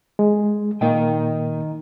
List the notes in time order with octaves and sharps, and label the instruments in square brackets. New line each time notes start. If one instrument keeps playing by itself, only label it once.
[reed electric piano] G#3
[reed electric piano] A#2 A#3 [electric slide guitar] D#3 D#5 G5